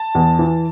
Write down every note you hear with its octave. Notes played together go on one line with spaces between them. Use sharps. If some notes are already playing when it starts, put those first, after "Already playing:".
Already playing: A5
E2
E3